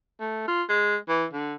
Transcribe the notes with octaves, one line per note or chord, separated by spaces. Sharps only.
A3
F4
G#3
E3
D3